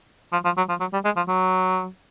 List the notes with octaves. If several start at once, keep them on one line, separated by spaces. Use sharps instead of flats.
F3
F3
F#3
F3
F#3
G3
G#3
F3
F#3